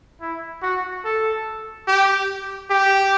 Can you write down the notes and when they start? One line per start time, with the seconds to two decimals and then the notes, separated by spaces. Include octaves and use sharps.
0.21 E4
0.62 F#4
1.04 A4
1.88 G4
2.70 G4